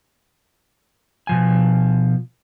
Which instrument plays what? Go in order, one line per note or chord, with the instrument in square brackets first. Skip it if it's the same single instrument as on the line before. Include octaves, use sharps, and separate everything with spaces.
[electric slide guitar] B2 F3 G#5